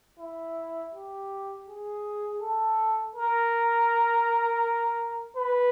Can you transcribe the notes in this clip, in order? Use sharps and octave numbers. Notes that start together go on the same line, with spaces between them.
E4
G4
G#4
A4
A#4
B4